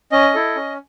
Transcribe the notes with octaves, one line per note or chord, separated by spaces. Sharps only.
C#4 D#5
E4 A4
C#4